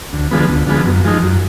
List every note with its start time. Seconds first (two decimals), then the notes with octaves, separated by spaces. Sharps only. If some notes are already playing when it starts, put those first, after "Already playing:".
0.13 D2
0.31 D3 F3 G#3 B3
0.49 D2
0.67 D3 F3 G#3 B3
0.86 F#2
1.04 F3 G#3 D#4
1.22 F#2